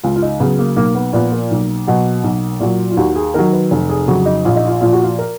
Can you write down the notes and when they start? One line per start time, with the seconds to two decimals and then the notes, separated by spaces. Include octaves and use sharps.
0.04 C#2 F4
0.16 F4
0.22 D#4
0.40 C#3 F#3 B3
0.59 A#3
0.76 B1 A#3
0.95 B3
1.13 A#2 F3 B3
1.32 A#3
1.51 B1
1.87 B2 F#3
2.24 B1
2.60 A#2 F#3
2.91 F4
2.97 D#2 F#4
3.16 G#4
3.34 D#3 F#3 A#4
3.53 B4
3.71 F1
3.89 G#4
4.08 F2 C#3 F#3 F#4
4.26 D#4
4.45 A#1 F4
4.56 D#4
4.67 F4
4.81 A#2 F3 F4
4.93 F#4
5.04 F4
5.19 A#4